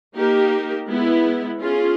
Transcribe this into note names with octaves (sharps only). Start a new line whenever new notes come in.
A#3 D#4 G4 A#4
G#3 B3 E4
C#4 F4 G#4